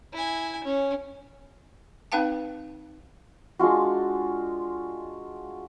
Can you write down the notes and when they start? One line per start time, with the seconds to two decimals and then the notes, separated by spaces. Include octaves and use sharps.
0.13 E4 G#5
0.64 C#4
2.12 C4 D#4 B4 F5 G5 A5
3.59 G#3 D4 F4 F#4